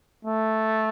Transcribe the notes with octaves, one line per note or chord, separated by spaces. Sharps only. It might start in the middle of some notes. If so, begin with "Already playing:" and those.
A3